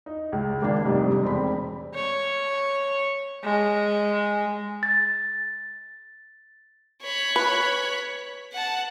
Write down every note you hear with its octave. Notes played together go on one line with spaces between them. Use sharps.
D#4
C#2
G#1 A#3 D4
F1 G#2 C3 G3
E1 C4 B5
C#5
G#3
A6
C#5 B5
B4
F#5 A5